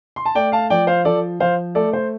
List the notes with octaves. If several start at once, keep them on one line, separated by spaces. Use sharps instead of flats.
C6
A5
A3 D5 G5
F5 A5
F3 D5 G5
C5 F5
F3 A4 D5
F3 C5 F5
A3 A4 D5
C5